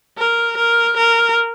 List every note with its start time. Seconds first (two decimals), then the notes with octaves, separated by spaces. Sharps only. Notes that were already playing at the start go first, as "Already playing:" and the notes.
0.18 A#4
0.57 A#4
0.97 A#4